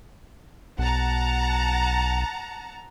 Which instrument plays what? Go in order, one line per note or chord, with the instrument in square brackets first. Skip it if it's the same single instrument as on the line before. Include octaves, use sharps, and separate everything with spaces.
[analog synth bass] B1 [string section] F#5 A5 A#5